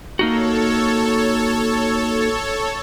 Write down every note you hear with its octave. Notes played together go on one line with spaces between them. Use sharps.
A#3 D#4 F#4 A4 C#5